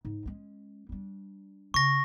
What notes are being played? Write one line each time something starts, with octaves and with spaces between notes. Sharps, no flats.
G#2
G#3 C#4
G3 D4
C#3 C#6 A#6